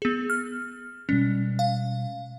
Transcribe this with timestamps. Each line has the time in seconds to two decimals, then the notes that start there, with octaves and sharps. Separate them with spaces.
0.02 B3 G#4
0.30 F6
1.09 B2 G3 G#3 C#4
1.59 F5